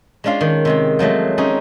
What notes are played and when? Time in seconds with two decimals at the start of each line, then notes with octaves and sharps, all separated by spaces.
0.24 G#3 C#4 D4 F4 F5
0.41 D#3
0.65 C3 G#3 C4
0.99 F3 F#3 G#3 A3
1.38 C4 C#4 D#4 G#4